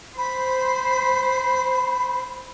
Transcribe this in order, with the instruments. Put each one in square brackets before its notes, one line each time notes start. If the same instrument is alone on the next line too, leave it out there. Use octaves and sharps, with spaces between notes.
[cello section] C5 [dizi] B5